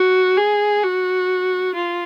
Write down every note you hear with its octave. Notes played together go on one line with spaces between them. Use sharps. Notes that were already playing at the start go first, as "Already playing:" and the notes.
Already playing: F#4
G#4
F#4
F4